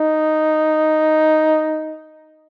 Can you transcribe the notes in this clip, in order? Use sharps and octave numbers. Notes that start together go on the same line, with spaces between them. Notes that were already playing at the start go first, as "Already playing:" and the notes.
Already playing: D#4